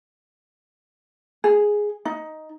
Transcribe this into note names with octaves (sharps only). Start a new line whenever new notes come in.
G#4
D#4